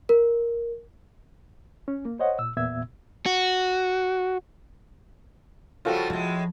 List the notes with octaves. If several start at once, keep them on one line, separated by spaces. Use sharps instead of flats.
A#4
C#4
A#3
C5 C#5 D#5 F#5
A#2 E6
E2 A#2 B3 E5 E6 G#6
F#4
C#3 F3 G3 F4 F#4 A4
A2 F3 G#3